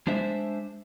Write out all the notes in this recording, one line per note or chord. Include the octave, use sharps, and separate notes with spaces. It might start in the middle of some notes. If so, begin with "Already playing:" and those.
G#3 D4 C5 E5